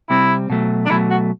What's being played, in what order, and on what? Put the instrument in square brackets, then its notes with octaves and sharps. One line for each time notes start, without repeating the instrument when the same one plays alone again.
[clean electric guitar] C3 G3 C4 [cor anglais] E4
[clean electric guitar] B2 F#3 A3
[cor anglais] D4
[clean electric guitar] B2 F#3 A3 [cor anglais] E4
[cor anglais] F#4